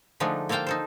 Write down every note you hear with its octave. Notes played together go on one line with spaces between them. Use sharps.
D3 F3 G#3 A3 D4 D#4
A#3 A4 C5 F5 G5 A5
D#4 A4 C5